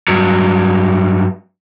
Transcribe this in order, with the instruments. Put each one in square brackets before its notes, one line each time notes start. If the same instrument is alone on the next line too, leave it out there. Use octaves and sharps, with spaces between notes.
[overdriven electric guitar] G2 F#3